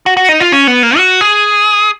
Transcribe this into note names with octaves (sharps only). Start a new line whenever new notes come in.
F#4
F#4
D#4
F4
C#4
B3
A#3
F#4
G#4